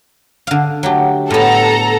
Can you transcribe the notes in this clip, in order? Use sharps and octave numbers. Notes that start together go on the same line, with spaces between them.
D3 F5
F#3 A3 G4
A2 B3 A4 A#5